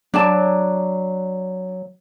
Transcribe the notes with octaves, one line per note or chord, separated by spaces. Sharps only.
F#3 D4 D5 A5